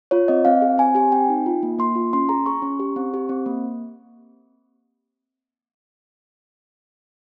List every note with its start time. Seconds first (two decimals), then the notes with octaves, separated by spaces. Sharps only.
0.11 F4 C#5
0.28 C4 D#5
0.45 C4 F5
0.62 G#4
0.78 C4 G#5
0.95 G4 G#5
1.12 C4 G5
1.29 D#4
1.46 F4
1.63 A#3
1.79 A#3 C6
1.95 F4
2.13 C#4 C6
2.29 G#4 A#5
2.46 G#4 C#6
2.62 C#4
2.80 G4
2.96 C4
3.14 G4
3.29 C4
3.46 A#3